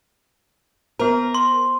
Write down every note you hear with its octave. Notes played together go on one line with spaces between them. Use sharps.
B3 A#4 C5
C6